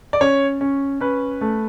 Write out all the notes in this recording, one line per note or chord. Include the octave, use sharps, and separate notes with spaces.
D5
C#4 C#5
C#4
C#4 B4
A3